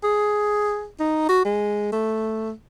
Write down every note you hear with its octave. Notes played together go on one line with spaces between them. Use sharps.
G#4
D#4
F#4
G#3
A3